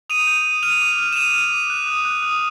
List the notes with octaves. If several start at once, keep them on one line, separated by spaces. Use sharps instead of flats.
D#6 D#7 F7
G6
D#6
F6 D#7 F7
D6
F6
E7
D6 D#7 F7
F6
D6
F#6
D#6
F#6
D#6